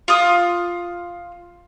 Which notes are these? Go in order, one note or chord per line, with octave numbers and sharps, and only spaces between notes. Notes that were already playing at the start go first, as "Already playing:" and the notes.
F4 D#6